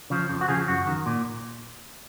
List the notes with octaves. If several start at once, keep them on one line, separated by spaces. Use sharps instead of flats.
C#3 F3
F2
F#4
C#3 F3 G#4
F#2 F#4
D#3
A#2